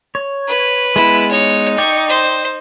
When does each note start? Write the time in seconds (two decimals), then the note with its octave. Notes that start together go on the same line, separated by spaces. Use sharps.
0.15 C#5
0.48 B4
0.96 G#3 B3 E4
1.31 D#4 C#5
1.78 D5 G5 C#6
2.09 C5